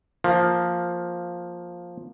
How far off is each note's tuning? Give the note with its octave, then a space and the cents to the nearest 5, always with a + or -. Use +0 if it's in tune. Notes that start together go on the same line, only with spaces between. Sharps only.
F3 +10 A#3 +0